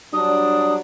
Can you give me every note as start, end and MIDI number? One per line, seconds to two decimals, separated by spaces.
0.13 0.78 54
0.13 0.78 55
0.13 0.78 62
0.13 0.74 87